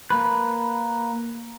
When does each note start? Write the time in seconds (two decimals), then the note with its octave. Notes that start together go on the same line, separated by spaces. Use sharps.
0.10 A#3 B4